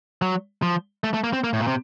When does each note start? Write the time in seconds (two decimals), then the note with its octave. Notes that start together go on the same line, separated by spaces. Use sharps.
0.22 F#3
0.62 F3
1.04 A3
1.14 A3
1.24 A#3
1.33 C4
1.44 A#3
1.53 A2
1.61 A#2
1.67 C3